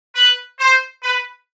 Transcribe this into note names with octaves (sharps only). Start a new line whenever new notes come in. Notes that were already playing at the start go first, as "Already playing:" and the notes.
B4
C5
B4